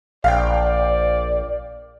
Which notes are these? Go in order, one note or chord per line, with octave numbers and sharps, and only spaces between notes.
A#1 D5 F5 G5